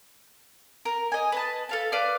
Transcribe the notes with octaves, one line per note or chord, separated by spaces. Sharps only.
A#4
D#5 G#5
B4 D#5 A5
A4 F5 A5
B4 D5 F5 F6